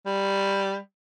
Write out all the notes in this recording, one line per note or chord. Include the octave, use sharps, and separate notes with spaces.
G3